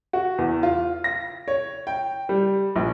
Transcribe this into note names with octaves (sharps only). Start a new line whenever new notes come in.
F#4
E2
F4
A#6
C#5
G5
G3
A#1